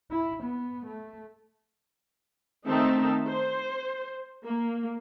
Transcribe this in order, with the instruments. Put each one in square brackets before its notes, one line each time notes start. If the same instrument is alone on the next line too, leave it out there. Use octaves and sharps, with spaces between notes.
[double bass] E4
B3
A3
[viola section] D#3 A3 C4 D#4 E5 A5
C5
A#3